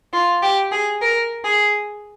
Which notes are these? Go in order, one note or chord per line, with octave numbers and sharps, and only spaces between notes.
F4
G4
G#4
A#4
G#4